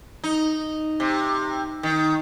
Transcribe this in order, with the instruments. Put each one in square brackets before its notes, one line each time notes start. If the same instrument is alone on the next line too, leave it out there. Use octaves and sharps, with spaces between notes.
[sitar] D#4
C3
D#3